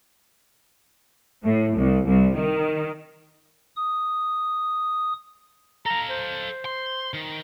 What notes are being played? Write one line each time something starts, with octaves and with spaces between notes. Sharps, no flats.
A2
C2
C2
D#3
D#6
A4 F5 A#5
C5
C6
D#3